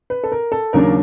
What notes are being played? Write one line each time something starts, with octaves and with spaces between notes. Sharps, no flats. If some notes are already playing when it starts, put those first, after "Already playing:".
B4
A4
A#4
A4
D#2 C#3 F#3 A#3 D4 A#4